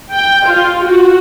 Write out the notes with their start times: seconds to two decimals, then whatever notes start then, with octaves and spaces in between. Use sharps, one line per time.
0.12 G5
0.48 F4
0.84 F#4